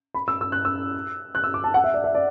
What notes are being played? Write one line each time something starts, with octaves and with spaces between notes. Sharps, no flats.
B5
E6
E6
F#6
E6
F#6
E6
D6
A5
F#5
E5
D5
E5
D5